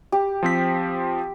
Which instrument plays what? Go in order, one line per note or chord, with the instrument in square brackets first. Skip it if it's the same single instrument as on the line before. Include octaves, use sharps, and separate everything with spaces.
[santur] G4
[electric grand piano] F3 C4 B6